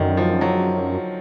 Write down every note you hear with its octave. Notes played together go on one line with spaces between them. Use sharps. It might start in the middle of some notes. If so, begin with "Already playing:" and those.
Already playing: F#2 D3 D#3
F3
F#3